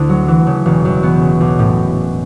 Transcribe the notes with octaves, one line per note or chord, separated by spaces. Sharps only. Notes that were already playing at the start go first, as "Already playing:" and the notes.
Already playing: D2 D3 E4
F#3
E3
C#3
E1
F#2
B3
C#3
B1
A2